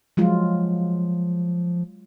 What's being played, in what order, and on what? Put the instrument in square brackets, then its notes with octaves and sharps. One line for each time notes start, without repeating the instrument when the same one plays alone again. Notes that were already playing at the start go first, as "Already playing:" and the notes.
[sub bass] F3 [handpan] F#3 G#3 F4